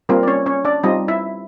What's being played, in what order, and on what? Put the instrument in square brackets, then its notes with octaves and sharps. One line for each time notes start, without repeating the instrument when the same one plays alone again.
[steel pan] G3 A#3 C4 F4 A#4
D5
C#4 C#5
C#4 C#5
D4 D5
G3 C4 D#4 F4 D#5
E4 E5